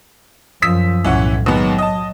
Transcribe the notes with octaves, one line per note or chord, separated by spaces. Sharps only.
F#2 F3 D#6 E6 B6
B1 A2 E3 C#4 F#5
D#2 G#2 F#3 B3
D#5 A5